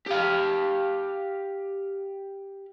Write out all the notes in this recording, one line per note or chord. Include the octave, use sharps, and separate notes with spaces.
G4 F5